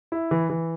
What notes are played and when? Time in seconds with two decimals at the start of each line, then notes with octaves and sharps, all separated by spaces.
0.12 E4
0.31 E3
0.49 E3